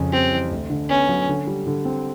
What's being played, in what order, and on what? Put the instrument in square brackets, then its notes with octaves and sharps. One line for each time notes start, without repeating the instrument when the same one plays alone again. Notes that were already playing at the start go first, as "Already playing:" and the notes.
Already playing: [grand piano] F2 C#3
[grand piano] G3 [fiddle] C4
[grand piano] E3
D2
D3
[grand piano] B3 [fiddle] C#4
[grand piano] F#3
D3
G3
D3
C4